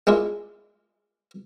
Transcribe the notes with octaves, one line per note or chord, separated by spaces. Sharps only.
G#3 A#3 D4 E4 F4